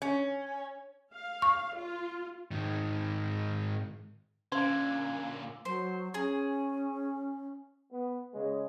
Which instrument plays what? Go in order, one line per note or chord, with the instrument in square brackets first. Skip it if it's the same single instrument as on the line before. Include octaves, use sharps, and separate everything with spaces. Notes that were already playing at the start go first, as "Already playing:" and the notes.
[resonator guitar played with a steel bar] C#4
[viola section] F5
[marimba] C#6
[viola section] F4
[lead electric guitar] G#2 D#3
[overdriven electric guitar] A#2 D3 [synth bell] C#4 [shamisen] C5 [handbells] F5 G#6
[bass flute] F#3 [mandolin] C5
[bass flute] C#4 [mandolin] G#4
[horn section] B3
C#3 G#3